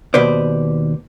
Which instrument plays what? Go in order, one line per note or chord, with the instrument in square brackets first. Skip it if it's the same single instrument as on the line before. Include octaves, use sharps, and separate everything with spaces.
[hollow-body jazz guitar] D#2 B2 B4 C5 D5